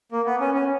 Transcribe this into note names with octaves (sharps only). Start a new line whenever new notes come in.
A#3
B3
C#4
C#4